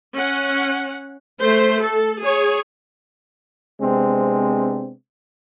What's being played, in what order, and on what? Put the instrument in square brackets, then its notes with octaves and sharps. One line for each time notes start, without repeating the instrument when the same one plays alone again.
[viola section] C#4 F#5
A3 C5
A4
G#4 C#5
[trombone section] C3 G#3 B3 C4 D4